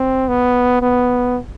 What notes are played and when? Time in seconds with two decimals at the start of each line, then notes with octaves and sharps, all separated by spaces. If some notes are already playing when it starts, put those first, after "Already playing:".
Already playing: C4
0.28 B3
0.82 B3